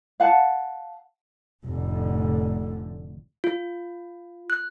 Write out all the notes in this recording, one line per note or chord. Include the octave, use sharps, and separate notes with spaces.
F5 F#5 A5
F1 A2 D3
F4
F#6